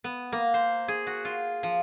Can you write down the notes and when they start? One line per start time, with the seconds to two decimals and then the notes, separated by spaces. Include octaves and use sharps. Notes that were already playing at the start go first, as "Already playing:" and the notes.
0.04 B3
0.32 A#3
0.54 C5
0.88 G#4
1.07 F#4
1.25 F4
1.63 F3